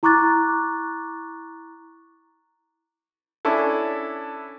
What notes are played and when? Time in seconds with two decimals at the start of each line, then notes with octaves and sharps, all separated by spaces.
0.03 E4 A#5 C#6 D6 F#6 A6
3.45 C#4 D4 E4 A4